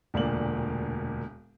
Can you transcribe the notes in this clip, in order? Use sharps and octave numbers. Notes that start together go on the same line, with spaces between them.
E1 D2 A#2 A#3 D5 F#7